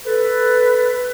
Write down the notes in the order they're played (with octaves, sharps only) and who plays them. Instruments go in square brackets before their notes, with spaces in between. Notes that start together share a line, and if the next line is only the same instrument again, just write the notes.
[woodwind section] A4 B4